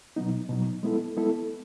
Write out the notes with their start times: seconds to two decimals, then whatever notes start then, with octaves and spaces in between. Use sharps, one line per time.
0.16 B2 F#3 B3 D#4
0.49 B2 F#3 B3 D#4
0.83 G#3 B3 E4 A4
1.17 G#3 B3 E4 A4